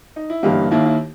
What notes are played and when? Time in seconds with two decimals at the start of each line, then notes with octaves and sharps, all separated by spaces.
0.16 D#4
0.30 E4
0.43 G1 G2 E3 A#3 D#4 G4
0.71 D#2 D#3 A#3 E4
0.85 E4